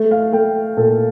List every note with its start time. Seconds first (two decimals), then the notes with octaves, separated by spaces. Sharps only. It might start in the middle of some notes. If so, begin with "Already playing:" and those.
Already playing: A3
0.11 F5
0.32 A3 G5
0.77 A#2 A4